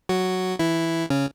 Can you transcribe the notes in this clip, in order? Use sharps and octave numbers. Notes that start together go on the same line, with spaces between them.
F#3 F#4
E3 E4
C#3 C#4